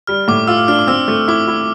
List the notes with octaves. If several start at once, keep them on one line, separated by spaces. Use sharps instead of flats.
G3 F6
A2 D6
F4 E6
D4 F6
D6
C4 E6
A3
E4 D6
E4